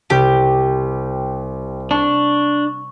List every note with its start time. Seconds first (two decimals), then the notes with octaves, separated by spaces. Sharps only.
0.10 C2 G4
1.91 D4 C#6